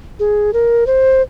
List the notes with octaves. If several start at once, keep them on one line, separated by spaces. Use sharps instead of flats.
G#4
A#4
C5